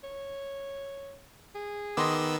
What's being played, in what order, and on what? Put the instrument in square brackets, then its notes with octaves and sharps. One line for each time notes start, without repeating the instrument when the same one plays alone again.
[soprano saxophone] C#5
G#4
[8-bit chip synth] D#3 B3 E6 [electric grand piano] D#5 C6 D6